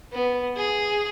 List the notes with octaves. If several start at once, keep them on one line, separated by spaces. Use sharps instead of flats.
B3
G#4